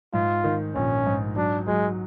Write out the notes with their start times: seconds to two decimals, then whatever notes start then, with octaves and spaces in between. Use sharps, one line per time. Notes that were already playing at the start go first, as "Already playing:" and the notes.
0.14 G#2 F4
0.44 D#3
0.75 A#1 C#4
1.06 G#2
1.36 F#3 D4
1.67 F#3 G#3